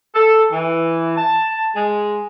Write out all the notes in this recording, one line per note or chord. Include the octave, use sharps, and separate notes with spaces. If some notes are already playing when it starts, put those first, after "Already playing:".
A4
E3
A5
G#3